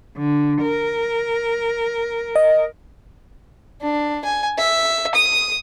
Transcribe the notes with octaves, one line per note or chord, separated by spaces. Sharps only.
D3
A#4
D#5
D4
G#5
E5
D#6